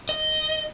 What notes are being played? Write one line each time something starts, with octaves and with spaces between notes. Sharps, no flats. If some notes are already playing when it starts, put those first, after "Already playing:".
D#5